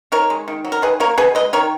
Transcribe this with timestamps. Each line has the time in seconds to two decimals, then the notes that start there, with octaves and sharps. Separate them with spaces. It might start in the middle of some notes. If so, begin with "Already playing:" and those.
0.12 D#3 A#4 C#5
0.30 G#3
0.48 D#3
0.64 F#3
0.72 A#4
0.82 D#3 G#4 B4
1.00 A#3 A#4 C#5
1.18 B2 G#4 B4
1.35 G#3 B4 D#5
1.53 D#3 A#4 C#5